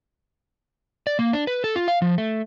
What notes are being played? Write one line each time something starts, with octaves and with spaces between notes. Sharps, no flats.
D5
A#3
D4
B4
A4
F4
F5
F3
A3